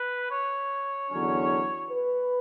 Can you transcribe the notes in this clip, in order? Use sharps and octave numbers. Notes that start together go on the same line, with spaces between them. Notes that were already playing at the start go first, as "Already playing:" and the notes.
Already playing: B4
C#5
E2 D3 F#3 C#4
B4